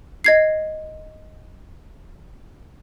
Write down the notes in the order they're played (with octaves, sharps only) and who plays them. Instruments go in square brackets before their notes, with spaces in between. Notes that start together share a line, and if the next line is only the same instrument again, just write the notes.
[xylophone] D#5 G#6 C7